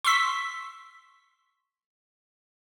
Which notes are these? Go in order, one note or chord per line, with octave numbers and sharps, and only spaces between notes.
C6 C#6 E6 B6